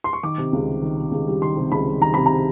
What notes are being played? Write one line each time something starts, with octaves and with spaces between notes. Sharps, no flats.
C6
C#6
D#3 D6
C3
C#2
G3
D#3
C3
C#2
G3
D#3 C6
C3
C#2 B5
G3
D#3 A#5
C3 B5
A#5